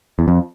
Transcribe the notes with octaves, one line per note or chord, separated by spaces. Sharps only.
E2
F2